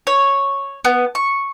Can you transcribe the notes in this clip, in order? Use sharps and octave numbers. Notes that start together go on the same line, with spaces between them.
C#5
B3
C#6